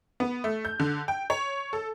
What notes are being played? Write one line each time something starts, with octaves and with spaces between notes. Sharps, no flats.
B3
A3
G6
D3
G5
C#5
A4